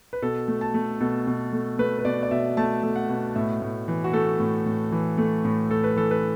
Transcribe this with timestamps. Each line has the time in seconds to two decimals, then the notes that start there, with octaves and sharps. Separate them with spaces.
0.13 B4
0.22 B2 A4
0.48 A3
0.61 A5
0.74 A3
1.01 B2 A4
1.27 B2
1.53 A3
1.79 A3 B4
1.99 B4
2.05 B2 D5
2.23 D5
2.31 B2 E5
2.57 A3 A5
2.83 A3
2.96 F#5
3.09 B2
3.35 A2 E5
3.62 A2
3.88 E3
4.04 F#4
4.13 A3 A4
4.40 A2
4.66 A2
4.92 E3
5.18 A3
5.44 A2
5.71 A2 A4
5.84 B4
5.96 E3 A4
6.11 B4